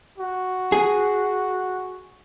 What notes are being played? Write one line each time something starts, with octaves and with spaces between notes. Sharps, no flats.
F#4
G#4